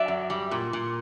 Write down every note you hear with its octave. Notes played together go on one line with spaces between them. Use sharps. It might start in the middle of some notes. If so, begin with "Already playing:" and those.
Already playing: F#3 D5 E5
F#2
G3
A#2
A#2